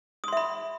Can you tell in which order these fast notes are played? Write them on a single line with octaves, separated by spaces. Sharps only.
D#6 C6 E5 B5